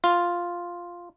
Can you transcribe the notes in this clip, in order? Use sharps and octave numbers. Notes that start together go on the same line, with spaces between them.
F4